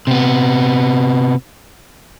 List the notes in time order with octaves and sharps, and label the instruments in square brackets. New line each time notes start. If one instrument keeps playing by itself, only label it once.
[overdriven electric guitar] C3 B3